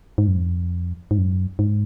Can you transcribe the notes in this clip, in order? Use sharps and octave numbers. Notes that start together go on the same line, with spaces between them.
G#2
F#2
F2
G#2
F#2
G#2